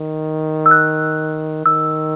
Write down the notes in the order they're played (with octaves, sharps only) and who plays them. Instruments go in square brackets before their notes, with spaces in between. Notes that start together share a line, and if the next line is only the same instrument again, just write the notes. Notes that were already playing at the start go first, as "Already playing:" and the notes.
Already playing: [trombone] D#3
[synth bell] E6
F#6
[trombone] D#3 [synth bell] E6